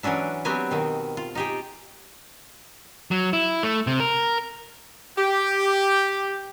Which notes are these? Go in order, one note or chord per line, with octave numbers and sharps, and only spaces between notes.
E3 F#3 C#4 D4 E4
F#3 B3 C4 G4 G#5
B2 D#3 C4
F4
D#4 G4 G#4
F#3
E4
A3
C3
A#4
G4